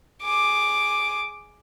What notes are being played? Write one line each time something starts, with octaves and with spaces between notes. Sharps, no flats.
G#4 D6